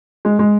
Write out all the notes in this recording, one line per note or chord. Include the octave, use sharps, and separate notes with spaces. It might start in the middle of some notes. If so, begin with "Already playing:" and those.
G#3
G#3